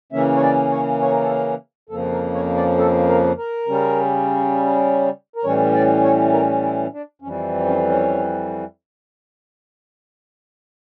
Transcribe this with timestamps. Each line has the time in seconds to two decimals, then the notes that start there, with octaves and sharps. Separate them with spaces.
0.12 C#3 E3 A#3 C#4 E5
0.37 C#5
0.42 D5
0.72 C#5
1.02 C#5
1.11 A#4
1.21 A4
1.30 A#4
1.89 F2 C#3 F3 A#3 A4
2.12 A#4
2.34 C#5
2.57 D5
2.78 A4
3.08 A#4
3.38 A#4
3.67 C#3 G3 C#4
5.36 A#4
5.44 A2 E3 G3 C#4 C#5
5.74 D5
6.04 C#5
6.33 A#4
6.63 E4
6.93 D4
7.22 F2 C#4
7.25 E3 G3
7.67 C#4
7.88 C#4